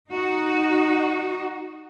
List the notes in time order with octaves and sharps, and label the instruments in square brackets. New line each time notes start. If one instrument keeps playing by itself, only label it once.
[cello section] D#4 F#4